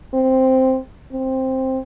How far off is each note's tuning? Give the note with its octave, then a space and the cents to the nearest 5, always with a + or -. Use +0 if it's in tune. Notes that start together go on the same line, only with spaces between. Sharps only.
C4 +0
C4 +5